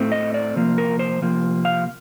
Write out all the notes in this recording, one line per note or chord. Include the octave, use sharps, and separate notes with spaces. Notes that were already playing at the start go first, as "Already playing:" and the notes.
Already playing: A2 A3 C4
D#5
D5
C3 F3 A#3
A#4
C5
C3 F3 A#3
F5